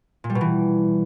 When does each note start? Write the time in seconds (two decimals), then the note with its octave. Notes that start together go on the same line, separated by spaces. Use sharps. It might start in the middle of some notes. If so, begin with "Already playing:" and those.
0.24 A#2
0.30 G3
0.35 B2
0.41 E3